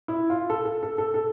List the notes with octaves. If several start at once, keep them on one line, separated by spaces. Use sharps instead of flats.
E4
F4
A4
A4
A4
A4
A4